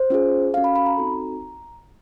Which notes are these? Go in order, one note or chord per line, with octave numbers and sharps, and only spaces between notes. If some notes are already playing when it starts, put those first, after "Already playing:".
Already playing: C5
C#4 F4 G#4
C#4 F#4 A4 F5
B5
B5
A#5
C4 D#4 F#4 A4